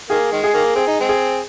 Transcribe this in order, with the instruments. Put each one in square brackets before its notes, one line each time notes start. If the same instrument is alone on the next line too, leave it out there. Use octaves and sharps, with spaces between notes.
[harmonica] D#3 A#3 [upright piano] G#4
[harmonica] D#3 G#3
[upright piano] G#4
[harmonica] D#3 A#3
[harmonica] C4 [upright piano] G#4
[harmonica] D#4
G#3 C4
[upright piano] G#4